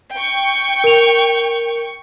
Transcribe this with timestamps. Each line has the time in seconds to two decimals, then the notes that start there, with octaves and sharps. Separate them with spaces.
0.15 G5 C#6
0.84 A#4 F7